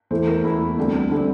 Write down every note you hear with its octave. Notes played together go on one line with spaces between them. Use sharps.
E2 E3 A3 C5
A#4
E2 E3 A3 E4
D2 D3 G3 C4
D3 G3 C4